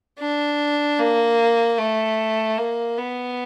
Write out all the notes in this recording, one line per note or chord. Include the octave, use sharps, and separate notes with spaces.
D4
A#3
A3
A#3
B3